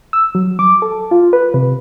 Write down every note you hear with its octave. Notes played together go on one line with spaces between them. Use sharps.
E6
F#3
D6
A4
F4
B4
C3